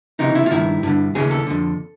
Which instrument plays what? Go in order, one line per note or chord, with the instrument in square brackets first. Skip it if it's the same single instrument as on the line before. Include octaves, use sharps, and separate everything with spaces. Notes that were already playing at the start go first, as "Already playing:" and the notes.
[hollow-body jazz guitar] C#2 C3 E3 D#4
E4
F4
G2 D#3 E4
G2 D3
D#2 C#3 E3 G#4
A4
F2 D3